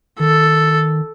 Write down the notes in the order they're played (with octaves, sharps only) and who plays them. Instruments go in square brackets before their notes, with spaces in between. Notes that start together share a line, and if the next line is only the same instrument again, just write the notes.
[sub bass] D#3 [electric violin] A4